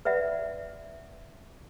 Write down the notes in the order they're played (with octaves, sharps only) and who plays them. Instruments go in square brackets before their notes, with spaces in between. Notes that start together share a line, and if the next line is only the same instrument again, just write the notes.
[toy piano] B4 D5 E5 F#5